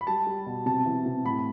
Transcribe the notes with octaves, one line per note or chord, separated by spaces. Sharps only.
B5
G3 A5
G3
B2
C3 A5
E3
C3
A2 B5